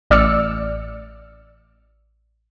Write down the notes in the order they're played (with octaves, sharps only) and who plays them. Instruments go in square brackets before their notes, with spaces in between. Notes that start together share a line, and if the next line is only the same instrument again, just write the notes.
[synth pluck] A1 D5 E6 F6 C#7